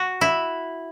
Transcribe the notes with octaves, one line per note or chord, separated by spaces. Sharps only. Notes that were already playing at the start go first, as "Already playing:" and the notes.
Already playing: F#4
E4